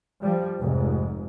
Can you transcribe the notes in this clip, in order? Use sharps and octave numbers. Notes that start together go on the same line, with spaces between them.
F3 G3
F1 G#2